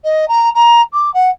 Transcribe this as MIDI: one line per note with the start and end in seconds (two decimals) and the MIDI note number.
0.04 0.28 75
0.28 0.50 82
0.55 0.81 82
0.93 1.12 86
1.14 1.30 78